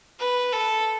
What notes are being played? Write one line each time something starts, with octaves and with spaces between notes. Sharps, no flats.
B4
A4